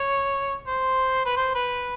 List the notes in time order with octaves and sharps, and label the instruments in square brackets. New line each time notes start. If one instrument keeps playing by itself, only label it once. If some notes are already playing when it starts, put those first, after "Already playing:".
Already playing: [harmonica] C#5
C5
B4
C5
B4